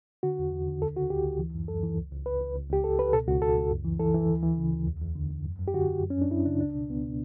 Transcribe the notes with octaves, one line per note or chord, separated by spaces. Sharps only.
D3 F#4
E2
E2
D3
D2 A4
C#3 F#4
D2 G4
D2
E3
F#2
F#2 A4
E3
C#2
C#2
C#2 B4
C#2
C#2
C#2 G4
C#2 A4
C#2 B4
B2 A4
C#2 F#4
C#2 A4
C#2
F#2
E3
E3 A4
E3
D2
E3
C#3
D2
E2
E2
D3
E2
F#2
F#2
G4
D3 F#4
F#2
F#2
C#4
F#2 D4
F#2 E4
C#3 D4
C#2 D4
B2
C#2 B3
B2